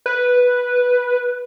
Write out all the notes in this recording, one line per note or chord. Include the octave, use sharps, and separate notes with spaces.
B4